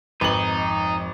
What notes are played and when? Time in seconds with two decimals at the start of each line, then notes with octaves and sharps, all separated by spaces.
0.21 G#1 F2 D#4 B4 F#7